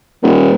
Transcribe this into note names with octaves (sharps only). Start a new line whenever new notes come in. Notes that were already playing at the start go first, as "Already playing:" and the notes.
D#1